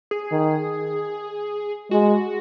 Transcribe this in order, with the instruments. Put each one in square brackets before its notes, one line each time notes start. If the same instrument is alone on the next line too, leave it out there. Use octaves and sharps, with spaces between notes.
[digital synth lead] G#4
[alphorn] D#3
[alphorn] G#3 [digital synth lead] F#4